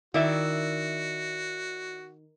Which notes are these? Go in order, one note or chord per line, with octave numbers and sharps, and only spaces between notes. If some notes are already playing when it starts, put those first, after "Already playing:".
D#3 E4 F#4 D5 E5